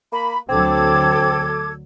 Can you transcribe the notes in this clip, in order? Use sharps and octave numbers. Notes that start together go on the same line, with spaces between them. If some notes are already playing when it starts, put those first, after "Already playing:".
A#3 B5
D2 D3 F#3 C4 A4 D6 G#6